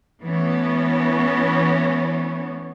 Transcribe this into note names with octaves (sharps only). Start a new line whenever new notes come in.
E3 A3 B3 C#4